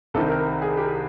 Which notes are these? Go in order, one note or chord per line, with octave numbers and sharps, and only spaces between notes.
C2 C3 D#3 A4
A#4
A#4
G#4
G4